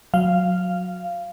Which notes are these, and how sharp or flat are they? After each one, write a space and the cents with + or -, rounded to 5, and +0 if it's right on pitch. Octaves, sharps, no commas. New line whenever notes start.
F#3 -20 F5 -10